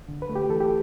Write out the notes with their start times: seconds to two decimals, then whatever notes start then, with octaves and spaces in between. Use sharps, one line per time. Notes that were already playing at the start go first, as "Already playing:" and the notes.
0.09 D3
0.22 B4
0.29 A3
0.36 G4
0.50 E3 A4
0.60 G4